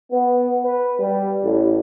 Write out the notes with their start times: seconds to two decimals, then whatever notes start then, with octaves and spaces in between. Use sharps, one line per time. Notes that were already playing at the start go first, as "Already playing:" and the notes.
0.11 B3
0.65 B4
0.99 G3
1.43 A1